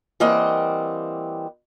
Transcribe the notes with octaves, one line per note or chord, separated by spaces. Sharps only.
E3 G3 A#3 C4 D#5 F#5